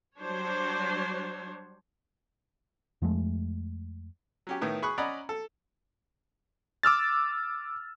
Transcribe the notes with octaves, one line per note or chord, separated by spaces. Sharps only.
F#3 G3 D4 C5 C#5
F2 F3 G#3 A3
F#3 C#4 G4
A2 D#3 B3
G#4 B5 C#6 D#6 F#6
C#4 D5 D#5 F#5 A#5 B5
A4
D6 E6 F6 A6